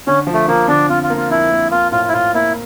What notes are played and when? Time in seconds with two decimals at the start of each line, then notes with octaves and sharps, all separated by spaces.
0.07 D3 C#4
0.27 F3
0.34 A3
0.48 F3 A#3
0.68 D3 D4
0.89 F2 F4
1.03 F4
1.10 A#3
1.17 F4
1.30 F2 E4
1.51 A#3
1.71 A#3 F4
1.92 A2 F4
2.08 E4
2.13 A2 F4
2.34 A#3 E4